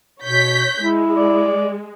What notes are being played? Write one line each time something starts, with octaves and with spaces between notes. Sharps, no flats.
B2 C#5 G6 B6
G#3 E4
D5